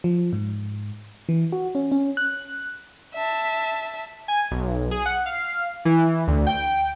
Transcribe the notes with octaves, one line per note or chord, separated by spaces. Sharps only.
F3
G#2
E3
F#4
C#4
C#4
F#6
E5 A5
G#5
B1
G#4
F#5
F5
E3
D2
G5